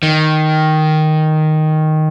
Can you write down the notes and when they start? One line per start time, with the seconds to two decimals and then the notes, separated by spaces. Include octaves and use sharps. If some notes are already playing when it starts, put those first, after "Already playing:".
0.03 D#3